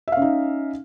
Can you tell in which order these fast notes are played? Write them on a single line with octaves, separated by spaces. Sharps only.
E5 F5 C#4 D#4